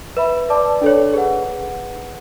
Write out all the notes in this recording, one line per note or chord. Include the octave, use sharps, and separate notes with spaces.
B4 E5 B5
B4 D5 A5 D6
D4 A4 C#5
G#4 B4 F#5